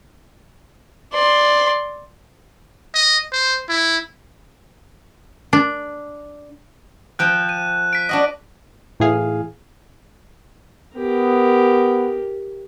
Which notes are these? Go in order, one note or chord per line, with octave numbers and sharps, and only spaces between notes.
D5 C6
D#5
C5
E4
D4
F3 G5 F#6
D#7
B6 D7
D4 F#4 D#5
A2 E3 G#4 F5
B3 G4 A#4